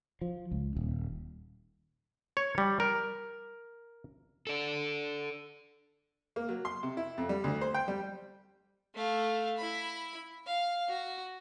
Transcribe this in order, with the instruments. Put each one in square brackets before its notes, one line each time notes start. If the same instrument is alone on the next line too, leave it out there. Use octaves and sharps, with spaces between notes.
[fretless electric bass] F3
C#2
D#1
[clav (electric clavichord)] C#5
G3
A#4
[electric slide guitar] A4 D5
[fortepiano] A#3
F#3
C6
C3
E4
F2
G3
D2
C5
G5
G3
[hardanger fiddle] A3 F5
E4 B5
F5
F#4